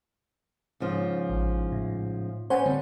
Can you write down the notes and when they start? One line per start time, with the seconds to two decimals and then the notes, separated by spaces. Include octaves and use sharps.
0.80 G#2 C#3 F3
1.30 A1
1.72 A2
2.50 B3 C#4 C5 F#5 G#5
2.66 D3 G3 C4